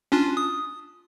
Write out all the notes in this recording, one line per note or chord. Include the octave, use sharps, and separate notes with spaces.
C#4 D4 F4
D#6